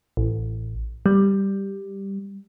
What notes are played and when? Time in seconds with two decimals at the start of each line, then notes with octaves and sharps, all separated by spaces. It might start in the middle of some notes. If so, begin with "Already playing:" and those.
0.17 A1
1.06 G3